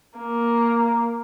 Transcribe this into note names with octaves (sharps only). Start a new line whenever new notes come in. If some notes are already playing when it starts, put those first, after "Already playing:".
A#3